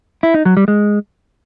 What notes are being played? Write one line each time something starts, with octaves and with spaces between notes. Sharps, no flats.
E4
D#4
F#3
G3
G#3